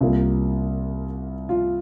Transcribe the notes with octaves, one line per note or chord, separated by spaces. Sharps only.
C2 C3 G3 A#3 F4
F4